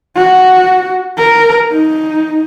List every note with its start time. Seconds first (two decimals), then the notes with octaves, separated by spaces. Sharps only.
0.16 F#4
1.17 A#4
1.72 D#4